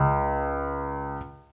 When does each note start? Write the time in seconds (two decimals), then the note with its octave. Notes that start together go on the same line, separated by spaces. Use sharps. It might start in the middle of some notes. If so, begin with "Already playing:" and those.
Already playing: C#2